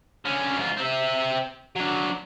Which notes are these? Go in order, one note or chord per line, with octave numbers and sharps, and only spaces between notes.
D3 C#4
G#2 F4
C4 E5
F#3 D4